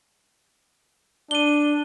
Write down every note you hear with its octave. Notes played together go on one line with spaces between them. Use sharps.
D4 D#7 G7